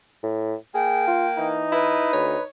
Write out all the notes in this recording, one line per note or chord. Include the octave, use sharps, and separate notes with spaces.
A2
A#3 G#4 G5
F4
E3 D#4
E4 B4
D2 C#5